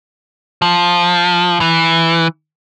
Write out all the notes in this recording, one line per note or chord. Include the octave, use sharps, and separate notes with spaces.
F3
E3